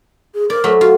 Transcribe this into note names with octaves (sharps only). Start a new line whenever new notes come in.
G#4
A#4 D5
F#3 A3 B5
F4 F#4